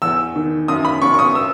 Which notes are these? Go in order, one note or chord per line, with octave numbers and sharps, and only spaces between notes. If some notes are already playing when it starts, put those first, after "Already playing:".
E2 E6
D#3
F#2 D#6
B5
F#2 C#6
C#6
D#6
E6